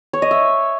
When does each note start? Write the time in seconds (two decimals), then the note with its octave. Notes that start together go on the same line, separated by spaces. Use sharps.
0.13 C#5
0.22 D#5
0.31 E5